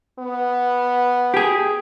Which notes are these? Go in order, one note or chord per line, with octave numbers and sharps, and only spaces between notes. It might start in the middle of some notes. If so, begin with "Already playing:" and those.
B3
G4 G#4